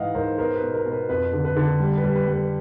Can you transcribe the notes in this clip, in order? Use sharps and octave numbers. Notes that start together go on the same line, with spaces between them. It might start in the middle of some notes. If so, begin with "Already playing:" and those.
Already playing: G#2 E3 D#5 F5 F#5
G#2 A#4 C5
B3 A#4 C5
B4
B2
A#4
B2
B4
F2 B4
D3
B4
D3
G3
B4
G3
B4
G3
B4